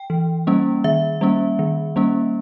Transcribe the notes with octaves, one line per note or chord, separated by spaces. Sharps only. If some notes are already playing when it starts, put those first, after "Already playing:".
Already playing: G5
E3
G3 A#3 C#4
D#3 E5
G3 A#3 C#4
D#3
G3 A#3 C#4